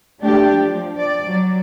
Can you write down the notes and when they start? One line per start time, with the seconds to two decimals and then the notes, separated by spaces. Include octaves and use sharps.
0.20 A3 D4 G4
0.55 F3
0.97 D5
1.26 F#3